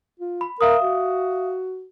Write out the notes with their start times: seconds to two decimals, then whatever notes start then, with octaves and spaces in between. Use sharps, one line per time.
0.20 F4
0.41 B5
0.61 A#4 E5 F5 D#6
0.82 F#4